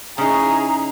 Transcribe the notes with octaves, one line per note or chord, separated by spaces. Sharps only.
C#3 D#4 E4 G#4 A#5